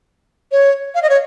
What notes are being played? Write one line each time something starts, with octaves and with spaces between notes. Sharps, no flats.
C#5
F5
D#5
C#5